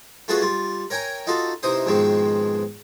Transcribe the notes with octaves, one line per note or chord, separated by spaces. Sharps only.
A3 F4 F#4 G#4 B4 F#5
G3 F4
A#4 C#5 G5 G#5 A#5
D#4 F4 F#4 A4
C3 E3 D#4 C5 C6 D#6
F2 G#2 B2 D#3 G#3 C4